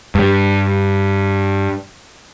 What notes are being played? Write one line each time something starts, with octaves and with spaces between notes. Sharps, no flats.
G2 G3